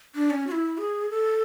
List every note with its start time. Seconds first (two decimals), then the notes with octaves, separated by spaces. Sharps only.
0.15 D4
0.30 C#4
0.47 F#4
0.52 E4
0.78 G#4
1.10 A4